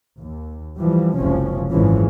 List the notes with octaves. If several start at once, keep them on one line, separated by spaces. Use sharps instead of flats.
D#2
E3 F3 G3
F#1 C#2 C3 F3 C#4
G#1 F#2 E3 F3 G#3 C#4